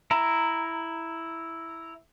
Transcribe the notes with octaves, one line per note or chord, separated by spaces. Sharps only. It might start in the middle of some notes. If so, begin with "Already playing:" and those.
E4 A#5